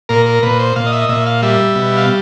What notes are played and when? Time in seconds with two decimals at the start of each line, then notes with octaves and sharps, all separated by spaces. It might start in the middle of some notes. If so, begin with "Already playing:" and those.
0.09 A#2 A#4
0.26 A#4
0.43 A#2 B4
0.59 C5
0.76 A#2 F5
0.86 D#5
0.93 E5
1.02 D#5
1.09 A#2 E5
1.26 F5
1.42 G3 E5
1.76 B2
1.97 F5